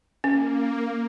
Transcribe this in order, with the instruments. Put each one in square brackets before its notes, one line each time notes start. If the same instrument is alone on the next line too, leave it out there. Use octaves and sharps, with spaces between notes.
[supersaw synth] A#3 [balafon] C#4